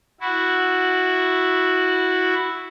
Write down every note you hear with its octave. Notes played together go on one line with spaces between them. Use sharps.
E4 F#4